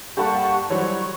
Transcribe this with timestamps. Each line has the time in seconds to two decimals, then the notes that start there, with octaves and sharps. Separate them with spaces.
0.17 G2 A#3 G4 A4 F#5 A5 B5 C#6
0.70 E3 F#3 G3 C5 C#5 C#6